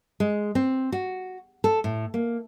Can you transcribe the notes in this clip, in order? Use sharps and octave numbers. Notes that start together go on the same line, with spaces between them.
G#3
C4
F#4
A4
A2
A#3